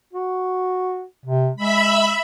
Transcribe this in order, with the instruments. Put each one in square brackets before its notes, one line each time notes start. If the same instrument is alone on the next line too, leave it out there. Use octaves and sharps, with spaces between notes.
[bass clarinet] F#4
C3
[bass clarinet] G#3 [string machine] E5 B5